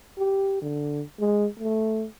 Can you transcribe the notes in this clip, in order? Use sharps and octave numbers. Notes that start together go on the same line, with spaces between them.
G4
D3
G#3
A3